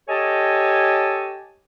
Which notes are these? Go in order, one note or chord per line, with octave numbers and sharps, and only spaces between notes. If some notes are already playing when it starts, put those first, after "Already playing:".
G4 A4 C#5 D#5 G#5 A5